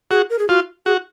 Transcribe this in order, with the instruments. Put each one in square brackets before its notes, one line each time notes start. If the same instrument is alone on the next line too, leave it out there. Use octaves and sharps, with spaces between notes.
[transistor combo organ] F#4 [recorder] G#4
[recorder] A#4
G#4
[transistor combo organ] F4 [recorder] F#4
[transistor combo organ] F#4 [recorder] G#4